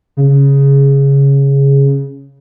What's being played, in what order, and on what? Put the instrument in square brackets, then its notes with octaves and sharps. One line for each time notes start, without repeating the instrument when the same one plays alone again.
[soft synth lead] C#3